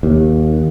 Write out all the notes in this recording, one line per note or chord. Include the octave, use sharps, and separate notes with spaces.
D#2